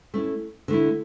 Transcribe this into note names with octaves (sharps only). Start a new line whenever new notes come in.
A3 C#4 E4
D3 A3 E4